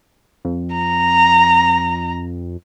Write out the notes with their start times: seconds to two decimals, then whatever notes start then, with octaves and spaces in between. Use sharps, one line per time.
0.45 F2
0.76 A#5